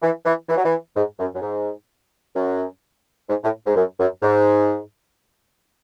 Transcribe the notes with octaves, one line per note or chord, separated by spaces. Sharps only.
E3
E3
E3
F#3
E3
G#2
F#2
F#2
G#2
F#2
G#2
A2
G#2
F#2
F#2
G#2